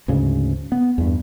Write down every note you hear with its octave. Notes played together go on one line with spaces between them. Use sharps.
D2 G#2 C#3
B3
E2 G2